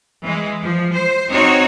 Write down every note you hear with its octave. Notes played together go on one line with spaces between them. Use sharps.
E3 G#3
F3
C5
C4 D#4 F#4 C#5